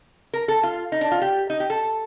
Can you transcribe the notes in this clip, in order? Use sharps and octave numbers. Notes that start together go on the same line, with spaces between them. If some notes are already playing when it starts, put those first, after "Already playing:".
A#4
A4
F4
D#4
D4
F4
G4
D#4
G4
A4